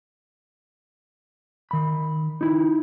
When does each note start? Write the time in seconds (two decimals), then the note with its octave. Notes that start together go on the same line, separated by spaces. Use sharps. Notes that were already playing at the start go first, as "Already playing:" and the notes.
1.71 D#3 B5
2.41 D#4 E4